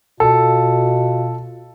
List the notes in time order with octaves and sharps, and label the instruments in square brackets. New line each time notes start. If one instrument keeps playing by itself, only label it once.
[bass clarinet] B2 [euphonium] F4 [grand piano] A4